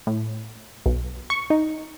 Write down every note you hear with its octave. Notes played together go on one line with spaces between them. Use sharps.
A2
B1
C#6
D#4